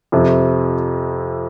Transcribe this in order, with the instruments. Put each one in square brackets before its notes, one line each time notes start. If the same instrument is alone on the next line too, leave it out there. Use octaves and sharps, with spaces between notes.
[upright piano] F2 C3 F3